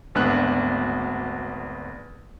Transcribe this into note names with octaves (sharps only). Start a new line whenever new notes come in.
G#1 D2 B3 D4 F#6